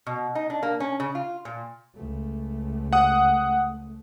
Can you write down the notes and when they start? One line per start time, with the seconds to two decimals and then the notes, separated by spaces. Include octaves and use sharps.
0.07 B2
0.35 D#4
0.50 D4
0.63 A#3
0.80 C#4
1.00 C#3
1.15 F4
1.45 A#2
1.94 C#2 A3
2.93 F#5 D#6